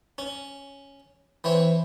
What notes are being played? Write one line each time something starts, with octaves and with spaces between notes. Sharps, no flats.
C#4
E3 C4 C#5